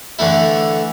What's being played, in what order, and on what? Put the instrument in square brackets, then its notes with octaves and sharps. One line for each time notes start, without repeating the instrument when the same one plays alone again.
[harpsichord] D3 E3 A3 E4